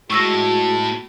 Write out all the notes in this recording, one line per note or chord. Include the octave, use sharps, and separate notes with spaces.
A2 G#3 F#4 C#6 E6 A#6